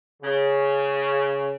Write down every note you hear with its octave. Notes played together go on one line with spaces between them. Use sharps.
C#3